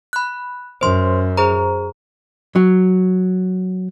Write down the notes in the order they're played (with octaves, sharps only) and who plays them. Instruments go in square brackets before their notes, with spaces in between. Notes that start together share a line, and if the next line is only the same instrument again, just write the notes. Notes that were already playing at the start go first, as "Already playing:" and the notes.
[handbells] B5 F#6
[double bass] F#2 [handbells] C5 C6
[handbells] G#4 C5 A#5
[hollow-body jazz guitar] F#3